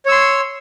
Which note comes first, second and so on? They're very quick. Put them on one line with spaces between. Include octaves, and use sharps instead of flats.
C#5 E6 C6